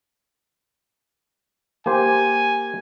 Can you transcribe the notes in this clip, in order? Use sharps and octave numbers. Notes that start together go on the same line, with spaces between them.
A#3 G4 C5 G#5